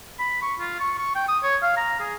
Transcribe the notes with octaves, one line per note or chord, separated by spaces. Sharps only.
B5
C#6
F4
C#6
C#6
G5
D#6
C#5
F5
A#5
G#4